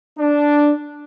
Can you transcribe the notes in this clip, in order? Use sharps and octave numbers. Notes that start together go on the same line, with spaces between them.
D4